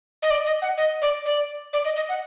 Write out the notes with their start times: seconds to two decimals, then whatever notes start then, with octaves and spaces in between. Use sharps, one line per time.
0.22 D#5
0.30 D5
0.46 D#5
0.62 F#5
0.78 D#5
1.02 D5
1.25 D5
1.73 D5
1.85 D#5
1.96 D#5
2.09 F#5